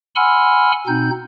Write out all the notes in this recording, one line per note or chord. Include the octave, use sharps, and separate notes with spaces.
F#5 G#5 B5 C6 E6 F6
B2 C4 D#4 G6